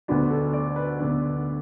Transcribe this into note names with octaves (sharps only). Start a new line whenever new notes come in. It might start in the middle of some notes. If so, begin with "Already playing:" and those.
D2 D3 B3 D4 F#4
A4
D5
B4
D2 D3 B3 D4